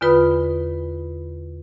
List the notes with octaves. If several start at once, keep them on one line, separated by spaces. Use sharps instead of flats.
E2 D3 F4 B4 B5 D#6